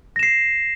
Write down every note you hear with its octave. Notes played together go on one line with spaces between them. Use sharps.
A#6 C7 E7